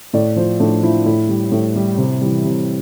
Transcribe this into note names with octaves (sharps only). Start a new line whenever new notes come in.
A2 D5
F3 C5
A2 D4
F3 E4
A2 E4
G3
A2
G3
C3
E3 G3
C3